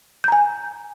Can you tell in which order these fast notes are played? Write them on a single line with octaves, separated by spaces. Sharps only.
G6 A#5 G#5